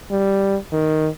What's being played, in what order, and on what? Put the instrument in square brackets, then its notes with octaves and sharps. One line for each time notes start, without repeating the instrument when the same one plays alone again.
[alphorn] G3
D#3